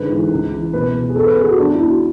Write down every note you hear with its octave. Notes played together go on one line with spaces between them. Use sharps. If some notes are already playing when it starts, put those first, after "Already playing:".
Already playing: G#2 D3 B4
E3
C#2
E3
B2 B4
B2
G#4
E2 A4
B4
C#3 G#4
F#4
E2 D4
E4
E2
F#4